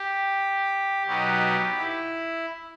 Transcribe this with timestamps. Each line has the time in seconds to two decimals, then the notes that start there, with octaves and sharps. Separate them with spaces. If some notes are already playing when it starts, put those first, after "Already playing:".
Already playing: G4
1.06 B2 F#3 B3 D#4 G4
1.78 E4